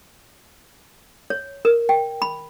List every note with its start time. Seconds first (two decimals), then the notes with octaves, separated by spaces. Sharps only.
1.30 C#5
1.65 A#4
1.89 G5
2.22 B5